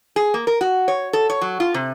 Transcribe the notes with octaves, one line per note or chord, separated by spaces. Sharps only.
G#4
A#3
A#4
F#4
C#5
A4
C#5
F#3
F4
C3